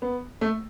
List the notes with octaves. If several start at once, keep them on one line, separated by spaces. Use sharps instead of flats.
B3
A3